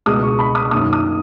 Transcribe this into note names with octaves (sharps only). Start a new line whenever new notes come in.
C#2 B2 G#3 D#6
C#6
B5
D#6
F#2 D#3 A#3 D#6
D#6